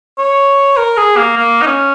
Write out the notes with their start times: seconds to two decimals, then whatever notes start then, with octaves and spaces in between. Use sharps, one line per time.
0.18 C#5
0.77 A#4
0.97 G#4
1.17 A#3
1.37 A#3
1.62 D#4
1.66 C#4